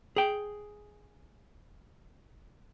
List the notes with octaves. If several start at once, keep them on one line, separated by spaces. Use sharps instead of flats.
G#4 G5